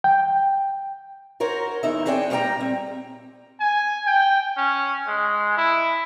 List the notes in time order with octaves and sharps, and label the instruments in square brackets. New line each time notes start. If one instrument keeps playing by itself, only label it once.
[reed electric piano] G5
[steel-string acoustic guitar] F#4 A#4 C5 C#5
E2 D#4 E5
C4 D4 G#4 C#5 F#5 G5
A#2 G3 G4 C5 G5 A#5
C4
[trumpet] G#5
G5
C#4
G#3
E4